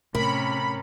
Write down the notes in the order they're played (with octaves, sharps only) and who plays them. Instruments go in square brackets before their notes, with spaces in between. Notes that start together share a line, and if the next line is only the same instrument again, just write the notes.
[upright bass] A2 [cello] C3 C#4 [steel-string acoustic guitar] A#4 [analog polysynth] B5